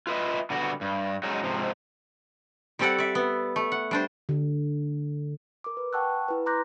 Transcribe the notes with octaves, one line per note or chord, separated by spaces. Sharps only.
F4 B4 D#5 E5
D3 G3 B3 F#4
G2
F#3 G#3 C#4 D#4
G#2 C3 F3
G3 C4 G4 A4 D5 F#5
D5 E5
B3
A3
F#5
G3 D4 C5
D3
A#4 D6
B4
F#5 G5 A5 C#6 E6 F#6
E4 B4
A#5 C6 D6 F#6 G6 A#6